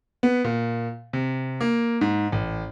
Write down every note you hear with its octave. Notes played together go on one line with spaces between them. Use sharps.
B3
A#2
C3
A#3
G#2
A1